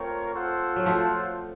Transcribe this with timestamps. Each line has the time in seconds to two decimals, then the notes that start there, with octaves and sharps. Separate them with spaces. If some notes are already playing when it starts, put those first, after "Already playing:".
Already playing: A3 C4 F4 A#4 C#5
0.33 F4 A4 C5 F#5
0.76 F#3
0.86 F3 A3